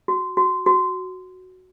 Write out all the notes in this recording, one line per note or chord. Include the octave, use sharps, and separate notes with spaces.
F#4
F#4
F#4